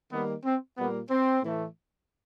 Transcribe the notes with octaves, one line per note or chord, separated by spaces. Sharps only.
D#3 G3 A#3 B3
C4
A#2 G3 A#3 B3
C4
A2 E3 A3